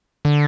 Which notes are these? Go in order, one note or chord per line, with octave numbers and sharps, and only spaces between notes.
D3